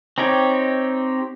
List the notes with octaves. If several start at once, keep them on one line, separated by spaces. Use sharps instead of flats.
C4 D#4 G4 C#5